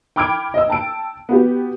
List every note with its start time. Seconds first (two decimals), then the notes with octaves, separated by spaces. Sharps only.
0.16 G5 B5 D6 F6 G#6 D7
0.54 D#5 E6
0.68 G5 A5 E6 D7
1.29 B3 F#4 G4